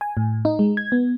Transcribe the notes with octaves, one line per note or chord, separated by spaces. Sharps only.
G#5
A2
D#4
G#3
G#6
B3